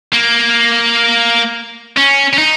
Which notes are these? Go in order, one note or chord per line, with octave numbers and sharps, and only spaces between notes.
A#3
C#4
C#4
D#4